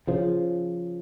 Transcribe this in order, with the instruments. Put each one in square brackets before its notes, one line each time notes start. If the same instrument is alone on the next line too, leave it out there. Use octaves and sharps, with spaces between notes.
[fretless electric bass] C#3 F3